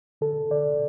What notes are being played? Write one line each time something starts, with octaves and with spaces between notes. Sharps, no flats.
D3 A4
D3 D5